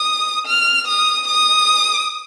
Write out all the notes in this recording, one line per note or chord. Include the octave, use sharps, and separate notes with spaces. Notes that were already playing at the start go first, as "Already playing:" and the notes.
Already playing: D#6
F6
D#6
D#6